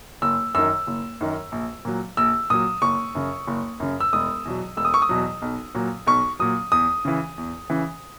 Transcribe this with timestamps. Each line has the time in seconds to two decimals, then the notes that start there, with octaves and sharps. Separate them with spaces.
0.22 F#1 E6
0.55 F#2 D#3 E6
0.87 F#1
1.21 F#2 D#3
1.52 A#1
1.85 A#2 F#3
2.17 A#1 E6
2.50 A#2 F#3 D#6
2.82 F#1 C#6
3.15 F#2 C#3
3.47 F#1
3.80 F#2 C#3
4.00 E6
4.13 E1 D#6
4.45 E2 B2 F#3
4.77 E1 E6
4.85 D#6
4.94 C#6
5.02 D#6
5.09 E2 B2 F#3
5.42 B1
5.75 A#2 F#3
6.07 B1 C#6
6.39 A#2 F#3 D#6
6.72 E2 D#6
7.05 C#3 E3
7.38 E2
7.70 C#3 E3